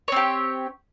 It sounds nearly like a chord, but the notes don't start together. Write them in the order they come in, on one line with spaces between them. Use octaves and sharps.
C#5 C4 G4